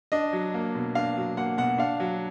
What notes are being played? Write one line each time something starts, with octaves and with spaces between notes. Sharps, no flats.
D4 D#5
F#3
A#3
B2
D4 F5
F#3
A#3 F#5
B2 F#5
D4 F5
F#3